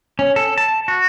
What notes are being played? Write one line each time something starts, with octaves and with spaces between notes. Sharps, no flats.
C#4
A4
A5
F#4